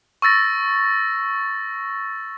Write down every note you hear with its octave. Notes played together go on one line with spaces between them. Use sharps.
C#6 E6 A6 A#6